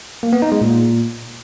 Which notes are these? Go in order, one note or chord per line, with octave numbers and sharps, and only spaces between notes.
A#3
B3
D#4
G#3
A#2